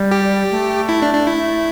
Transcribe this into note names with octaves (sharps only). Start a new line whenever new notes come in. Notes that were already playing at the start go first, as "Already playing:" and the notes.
Already playing: G3
G4
A3
E4
D4
D4
E4